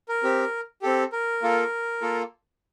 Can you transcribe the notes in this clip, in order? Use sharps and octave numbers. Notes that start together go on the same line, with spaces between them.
A#4
C4 G4
C4 G4 A4
A#4
A#3 F4 A4
A#3 F4 A4